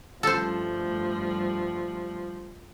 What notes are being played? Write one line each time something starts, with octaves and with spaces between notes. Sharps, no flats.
G2 F3 G3 A3 A4 C5